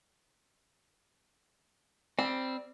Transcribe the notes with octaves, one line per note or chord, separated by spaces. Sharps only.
G3 C4